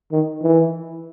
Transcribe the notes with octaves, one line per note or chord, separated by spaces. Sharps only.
D#3
E3